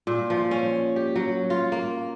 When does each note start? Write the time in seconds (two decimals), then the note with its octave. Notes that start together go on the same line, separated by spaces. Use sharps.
0.07 A#2
0.30 F3
0.51 C#4
0.96 G4
1.16 F#3
1.50 F4
1.72 A#3